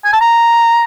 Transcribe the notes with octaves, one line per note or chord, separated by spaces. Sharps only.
G#5
A5
A#5